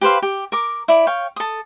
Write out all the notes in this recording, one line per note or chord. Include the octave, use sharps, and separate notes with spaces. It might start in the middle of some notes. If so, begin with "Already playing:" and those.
G4 B4 C5 F5
G4
A#4 D6
E4 D5
C#5 F5 G5
A4 D#6